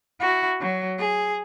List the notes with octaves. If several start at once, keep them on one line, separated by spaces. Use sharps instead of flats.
E4 F#4
F#3
G#4